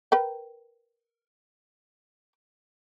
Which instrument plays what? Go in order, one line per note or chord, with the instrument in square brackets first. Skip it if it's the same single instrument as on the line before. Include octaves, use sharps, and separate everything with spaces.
[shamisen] A#4 B4 G5